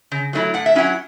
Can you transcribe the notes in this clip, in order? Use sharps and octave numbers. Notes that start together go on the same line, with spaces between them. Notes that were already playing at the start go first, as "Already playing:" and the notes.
C#3
F#3 A3 C#4 E4
A2 F#5
E5
F#3 C#4 E4 F#5